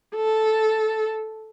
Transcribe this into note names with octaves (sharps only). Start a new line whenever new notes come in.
A4